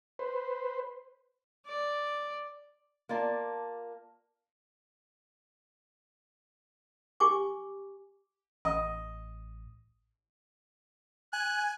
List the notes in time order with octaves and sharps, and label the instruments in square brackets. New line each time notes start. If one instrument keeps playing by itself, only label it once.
[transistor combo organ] B4 C5
[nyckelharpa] D5
[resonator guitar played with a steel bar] A#3 F4 D5 A5
[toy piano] G4 G#5 C#6 D6
[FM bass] A1 [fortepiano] D#5
[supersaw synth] G#5 [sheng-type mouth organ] F#6